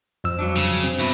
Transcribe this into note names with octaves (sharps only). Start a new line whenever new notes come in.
F2 F3 E6
G2 F#3 D4
C#3
C4
G2 B2 E4